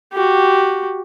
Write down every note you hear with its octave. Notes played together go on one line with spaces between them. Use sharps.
F#4 G4